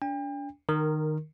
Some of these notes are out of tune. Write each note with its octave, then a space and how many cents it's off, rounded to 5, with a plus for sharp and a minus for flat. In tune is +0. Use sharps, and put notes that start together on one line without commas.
D4 -35 G5 +40
D#3 -20 A#4 +0